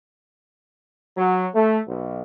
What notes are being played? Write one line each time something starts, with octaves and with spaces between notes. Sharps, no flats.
F#3
A3
B1